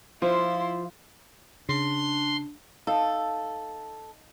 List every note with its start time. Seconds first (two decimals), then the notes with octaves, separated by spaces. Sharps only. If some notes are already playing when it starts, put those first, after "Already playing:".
0.22 F3 E4 F4 C5 C6
1.69 C#3 D4 C6
2.87 D#4 A4 F5 A5